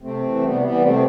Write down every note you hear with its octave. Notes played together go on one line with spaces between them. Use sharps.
C3 A3 C4
E3
C3 G3 B3
E3 G3 B3
C3 A3 C4